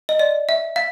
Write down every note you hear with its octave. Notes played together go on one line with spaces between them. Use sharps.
D#5
D5
E5
F5